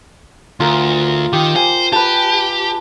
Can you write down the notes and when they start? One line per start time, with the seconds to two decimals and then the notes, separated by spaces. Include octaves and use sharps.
0.60 D2 F4 A#4
1.33 D#3 G4
1.56 C5 G#5
1.92 G4 B4 A5